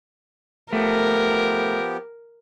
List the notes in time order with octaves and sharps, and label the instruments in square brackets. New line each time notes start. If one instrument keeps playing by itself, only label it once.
[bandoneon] F3 B3 G4 [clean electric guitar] A3 [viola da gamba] A#4